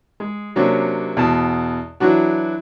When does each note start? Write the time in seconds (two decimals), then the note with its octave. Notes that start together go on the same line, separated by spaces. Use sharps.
0.20 G#3
0.56 C3 F#3 A#3 C#4 D4
1.17 E2 B2 A5
2.00 E3 F#3 D4 F#4